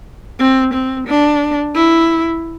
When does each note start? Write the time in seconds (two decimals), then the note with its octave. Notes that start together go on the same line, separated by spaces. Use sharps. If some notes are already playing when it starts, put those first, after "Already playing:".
0.40 C4
0.74 C4
1.07 D4
1.75 E4